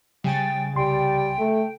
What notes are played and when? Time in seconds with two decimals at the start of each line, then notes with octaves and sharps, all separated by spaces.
0.24 C#3 G3 G5 G#5 A6
0.75 C2 G3 G5 C6
1.39 A3